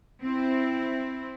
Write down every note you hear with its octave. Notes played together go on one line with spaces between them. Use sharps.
C4 E4